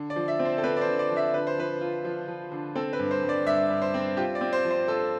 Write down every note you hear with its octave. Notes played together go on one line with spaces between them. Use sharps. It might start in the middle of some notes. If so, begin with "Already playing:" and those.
Already playing: D3
D5
F3
E5
C4
C5
A4
C4 B4
D5
C5
D3
D5
F3
E5
D3 B4
C5
F3 B4
F4
F3
F3
D3
C4 A4
B4
G2
C5
G2
D5
G2 E5
G2
C5
C4
F4 G4
D5
C4
C5
F3
C5
F4 A4